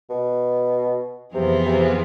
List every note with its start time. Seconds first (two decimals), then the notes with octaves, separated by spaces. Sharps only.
0.09 B2
1.34 F2 C3 E3 B3 F4 G#4
1.65 C3